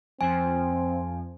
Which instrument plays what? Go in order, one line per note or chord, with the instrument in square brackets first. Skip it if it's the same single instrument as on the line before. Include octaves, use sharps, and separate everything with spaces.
[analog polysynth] F2 F3 [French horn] C4 [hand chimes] G#5